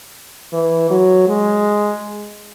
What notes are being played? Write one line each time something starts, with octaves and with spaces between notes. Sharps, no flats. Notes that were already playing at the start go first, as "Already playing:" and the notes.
E3
F#3
G#3